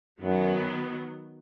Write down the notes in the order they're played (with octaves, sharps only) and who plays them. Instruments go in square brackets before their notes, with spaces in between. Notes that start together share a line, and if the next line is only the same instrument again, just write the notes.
[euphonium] F#2 [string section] D#3 F#3 B3